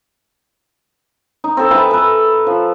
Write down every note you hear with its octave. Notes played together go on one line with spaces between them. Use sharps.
D#4
C4 A4
B4 E5 G#5 A5
A4 B4
F3